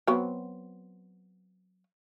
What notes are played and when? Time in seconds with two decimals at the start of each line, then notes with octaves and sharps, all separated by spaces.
0.07 F#3 B3 C4